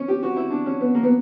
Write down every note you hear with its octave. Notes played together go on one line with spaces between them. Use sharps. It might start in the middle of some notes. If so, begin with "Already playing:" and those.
Already playing: C#4
G4
F#4
E4
D4
C#4
B3
A#3
B3